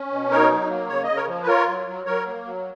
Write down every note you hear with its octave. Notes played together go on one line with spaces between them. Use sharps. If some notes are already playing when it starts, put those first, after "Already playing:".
Already playing: C#4
B2
D#4 A#4 C#5
F#3
A#3
C#3 C#5
D#5
C#3
A#4 C#5
F3
B4
F4 A#4 C#5
F#3
F#3
F#3 A#4 C#5
A#3
F#3